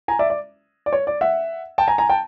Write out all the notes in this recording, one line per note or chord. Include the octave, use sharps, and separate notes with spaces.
G#5 A#5
D5 E5
D5
D5
C#5
D5
E5 F#5
G5 A5
G#5 A#5
G#5 A#5
G5 A5